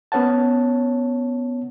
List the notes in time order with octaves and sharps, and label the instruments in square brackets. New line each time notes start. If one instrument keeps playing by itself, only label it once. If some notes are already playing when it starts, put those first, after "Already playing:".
[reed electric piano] B3 C#4 C#5 F#5 A5